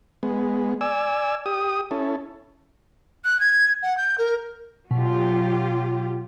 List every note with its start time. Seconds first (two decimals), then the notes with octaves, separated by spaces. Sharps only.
0.23 G#3 B3
0.81 D5 G#5 E6
1.46 G4 D#6
1.91 C#4 E4 A4
3.25 F#6
3.40 G#6
3.82 F#5
3.97 G6
4.18 A#4
4.91 B2 F#3 F4 G4